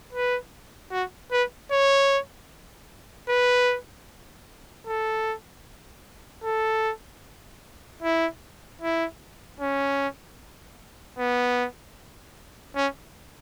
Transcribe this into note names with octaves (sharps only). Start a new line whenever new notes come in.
B4
F#4
B4
C#5
B4
A4
A4
E4
E4
C#4
B3
C#4